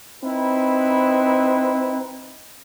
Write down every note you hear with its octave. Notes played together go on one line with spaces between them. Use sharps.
C4 D#4 E4 B4